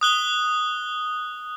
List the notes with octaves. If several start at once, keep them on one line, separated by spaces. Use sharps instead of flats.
D#6 F#6 G7